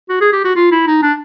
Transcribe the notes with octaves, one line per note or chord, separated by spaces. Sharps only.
F#4
G#4
G4
F#4
F4
E4
D#4
D4